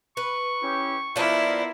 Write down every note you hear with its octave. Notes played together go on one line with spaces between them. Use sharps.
B4 C#6
C#4 E4 G4
F3 B3 D4 E4 F4 A#4